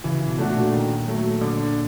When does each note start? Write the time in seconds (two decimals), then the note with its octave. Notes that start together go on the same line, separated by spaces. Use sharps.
0.04 C#3 E3
0.28 B2
0.38 A3 D4 F#4
0.50 A#2
0.73 D#3
1.07 F#3 A3
1.41 D3